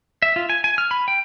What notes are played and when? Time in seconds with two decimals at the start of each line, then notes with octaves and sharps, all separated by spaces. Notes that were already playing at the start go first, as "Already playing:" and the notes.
0.22 E5
0.36 F4
0.50 G#5
0.64 G#5
0.78 F6
0.91 B5
1.08 G5